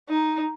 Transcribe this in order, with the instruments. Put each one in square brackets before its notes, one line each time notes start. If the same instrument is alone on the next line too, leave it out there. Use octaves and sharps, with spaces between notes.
[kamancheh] D#4